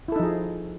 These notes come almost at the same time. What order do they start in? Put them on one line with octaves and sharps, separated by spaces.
E4 A4 D#4 F3 G#4